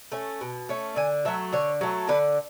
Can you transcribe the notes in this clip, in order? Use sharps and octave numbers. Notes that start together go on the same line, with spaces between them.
A3 C#4
B2
A3 C#4
D3 G#5
F#3 A3 E5
D3 C#5
F#3 A3
D3 B4